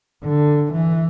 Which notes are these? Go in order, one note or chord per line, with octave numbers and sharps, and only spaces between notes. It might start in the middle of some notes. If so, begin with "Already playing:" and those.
D3
E3